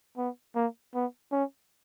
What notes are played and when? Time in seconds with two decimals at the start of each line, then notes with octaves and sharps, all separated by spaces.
0.18 B3
0.56 A#3
0.95 B3
1.32 C#4